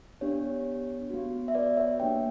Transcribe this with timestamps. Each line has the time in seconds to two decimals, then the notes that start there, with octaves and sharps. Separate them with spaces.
0.21 B3 D4 G4 C#5
1.10 B3 F#4
1.48 E5
1.55 B4 D5
1.77 C#5 E5
1.99 A#3 D4 G4 E5 G5